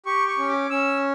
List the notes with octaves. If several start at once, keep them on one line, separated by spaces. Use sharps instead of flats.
G4 C#6
C#6
C#4
D6
C#4 E6